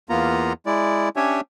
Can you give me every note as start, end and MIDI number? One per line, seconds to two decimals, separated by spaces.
0.09 0.53 40
0.09 0.53 58
0.09 0.53 59
0.09 0.53 65
0.09 0.53 82
0.66 1.09 56
0.66 1.09 64
0.66 1.09 74
1.16 1.41 61
1.16 1.41 62
1.16 1.41 67
1.16 1.41 73
1.16 1.41 76
1.16 1.41 80